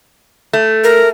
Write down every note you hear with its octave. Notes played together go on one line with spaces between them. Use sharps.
A3
A#4